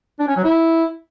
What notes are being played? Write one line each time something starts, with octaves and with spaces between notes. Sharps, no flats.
D4
C#4
F#3
E4